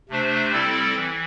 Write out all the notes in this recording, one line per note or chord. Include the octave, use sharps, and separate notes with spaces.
C3 A3 D4 C5
G3 C4 E4 A4 D5
E3